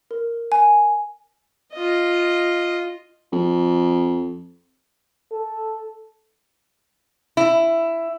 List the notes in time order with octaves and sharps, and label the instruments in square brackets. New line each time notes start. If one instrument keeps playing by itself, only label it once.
[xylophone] A#4
G#5
[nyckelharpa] F4 D#5
[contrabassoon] F2
[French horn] A4
[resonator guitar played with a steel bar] E4